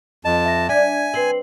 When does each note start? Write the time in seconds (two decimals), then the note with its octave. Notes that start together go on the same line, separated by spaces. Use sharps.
0.25 F2 D#5 A5
0.45 E5 A#6
0.69 D4 E5 G#5 G#6 B6
1.14 C4 B4 C7 F#7